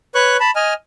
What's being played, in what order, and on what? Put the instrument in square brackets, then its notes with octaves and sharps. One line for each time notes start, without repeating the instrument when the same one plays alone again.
[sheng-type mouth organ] B4 C#5 C#6 F#6
A5 B5
D#5 G#5 F6